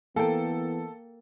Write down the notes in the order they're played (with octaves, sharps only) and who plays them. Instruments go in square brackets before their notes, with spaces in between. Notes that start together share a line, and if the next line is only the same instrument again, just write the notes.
[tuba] E3 [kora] A#3 G5 [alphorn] B3 [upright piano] A4